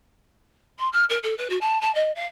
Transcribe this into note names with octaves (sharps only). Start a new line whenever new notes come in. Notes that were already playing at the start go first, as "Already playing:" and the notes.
C6
F6
A#4
A4
B4
F#4
A5
A5
D#5
F5